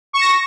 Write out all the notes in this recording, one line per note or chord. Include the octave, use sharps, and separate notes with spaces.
C#6 A#6 E7